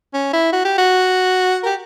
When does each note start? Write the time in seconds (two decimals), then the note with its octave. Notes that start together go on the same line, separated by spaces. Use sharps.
0.14 C#4
0.33 E4
0.52 F#4
0.64 G4
0.78 F#4
1.63 A#4
1.66 G4